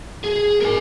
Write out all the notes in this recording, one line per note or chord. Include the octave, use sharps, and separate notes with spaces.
G#4
A#4 G#5